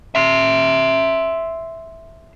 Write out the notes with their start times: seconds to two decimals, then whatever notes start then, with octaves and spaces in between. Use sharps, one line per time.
0.15 E5 C6